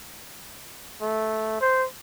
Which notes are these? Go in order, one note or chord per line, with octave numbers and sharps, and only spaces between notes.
A3
C5